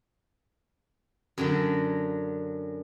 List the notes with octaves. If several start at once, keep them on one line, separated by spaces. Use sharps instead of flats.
F#2 D3 F#3